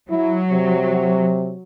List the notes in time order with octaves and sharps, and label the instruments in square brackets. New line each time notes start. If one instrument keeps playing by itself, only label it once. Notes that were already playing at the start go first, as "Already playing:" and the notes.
[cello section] F#3 [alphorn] E4
[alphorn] C3